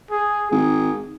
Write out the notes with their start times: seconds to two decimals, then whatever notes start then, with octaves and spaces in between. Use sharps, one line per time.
0.11 G#4
0.51 G#1 G#4